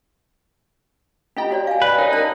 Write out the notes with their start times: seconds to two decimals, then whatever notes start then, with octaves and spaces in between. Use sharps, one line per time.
1.37 C#4 E4 F4 G4 D#5 G5
1.51 F#4 C#5 D5
1.67 F5 G#5
1.82 B4 D5
1.98 D#4 A#4 C#5
2.12 C#4 A#4 D5 A5